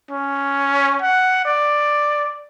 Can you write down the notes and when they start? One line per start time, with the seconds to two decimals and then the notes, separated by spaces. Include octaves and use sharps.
0.11 C#4
1.02 F#5
1.45 D5